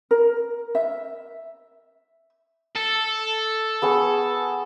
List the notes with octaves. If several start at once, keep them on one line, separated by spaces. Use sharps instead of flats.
A#4
E5
A4
B3 G#4 C#6